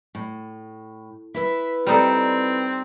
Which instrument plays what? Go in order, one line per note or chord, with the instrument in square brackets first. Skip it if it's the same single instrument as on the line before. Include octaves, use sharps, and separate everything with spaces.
[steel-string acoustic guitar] A2
E4 B4 E5
[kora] G3 D#4 A4 [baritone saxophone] C4